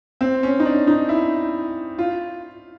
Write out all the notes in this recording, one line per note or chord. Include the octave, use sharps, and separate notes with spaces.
C4
C#4
D#4
D4
D#4
E4
F4